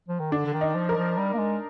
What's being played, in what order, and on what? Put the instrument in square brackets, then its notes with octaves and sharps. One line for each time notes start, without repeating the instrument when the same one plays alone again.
[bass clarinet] F3
D#3
[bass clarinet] D3 [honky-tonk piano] D4
[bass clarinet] D3
D#3
[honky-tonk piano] D#4
[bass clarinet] F3
[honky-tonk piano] A#4
[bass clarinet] F3
G3
A#3
G#3